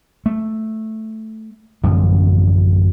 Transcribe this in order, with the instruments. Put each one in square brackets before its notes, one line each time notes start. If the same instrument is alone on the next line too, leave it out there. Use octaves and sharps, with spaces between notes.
[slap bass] A3
A1 F#2 D3 F3